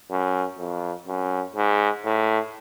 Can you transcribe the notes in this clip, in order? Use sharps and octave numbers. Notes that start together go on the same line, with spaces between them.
F#2
F2
F#2
G#2
A2